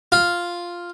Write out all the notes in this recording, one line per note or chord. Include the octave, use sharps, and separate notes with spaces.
F4